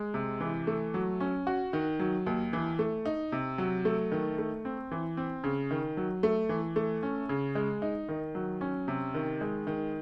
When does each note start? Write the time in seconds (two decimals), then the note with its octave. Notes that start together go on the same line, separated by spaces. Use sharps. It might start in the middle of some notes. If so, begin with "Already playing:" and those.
Already playing: G#3
0.14 C3
0.40 E3
0.67 A3
0.94 F#3
1.20 C#4
1.47 F#4
1.73 D#3
1.99 F#3
2.26 D#2
2.53 E3
2.79 A3
3.06 D#4
3.32 C3
3.58 F#3
3.85 A3
4.12 D#3
4.38 A3
4.65 C4
4.91 E3
5.17 C4
5.44 C#3
5.71 D#3
5.97 F#3
6.23 A3
6.49 E3
6.76 A3
7.03 C#4
7.29 C#3
7.55 G#3
7.82 D#4
8.09 D#3
8.35 F#3
8.61 C#4
8.88 C3
9.14 D#3
9.41 G#3
9.67 D#3